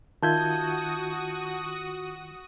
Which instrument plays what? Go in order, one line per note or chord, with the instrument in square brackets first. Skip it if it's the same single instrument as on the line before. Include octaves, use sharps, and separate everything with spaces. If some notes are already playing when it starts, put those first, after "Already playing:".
[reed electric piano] D#3 F4 E5 [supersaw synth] F#4 D#6 [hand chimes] A5 G6 G#6